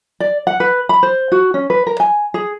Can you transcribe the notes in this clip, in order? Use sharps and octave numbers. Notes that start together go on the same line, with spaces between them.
D5
F#5
B4
B5
C5
F#4
C#4
B4
A#4
G#5
G#4